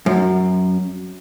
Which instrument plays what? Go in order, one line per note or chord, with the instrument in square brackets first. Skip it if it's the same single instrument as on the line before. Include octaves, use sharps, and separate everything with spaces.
[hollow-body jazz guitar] F#2